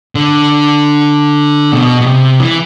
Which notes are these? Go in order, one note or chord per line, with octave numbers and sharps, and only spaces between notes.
D3
B2
B2
C3
E3